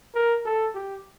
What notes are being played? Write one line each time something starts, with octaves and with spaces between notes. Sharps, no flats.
A#4
A4
G4